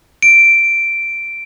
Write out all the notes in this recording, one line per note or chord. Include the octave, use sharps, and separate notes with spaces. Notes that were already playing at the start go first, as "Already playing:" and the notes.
D7